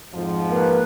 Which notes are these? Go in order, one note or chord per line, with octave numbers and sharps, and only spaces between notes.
F2 G#2 F3
A#3 B4